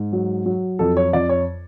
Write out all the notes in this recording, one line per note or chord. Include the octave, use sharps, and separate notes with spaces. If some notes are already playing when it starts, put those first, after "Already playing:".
Already playing: G#2
F#3
F#3
F2 A4
C#5
F2 D5
C#5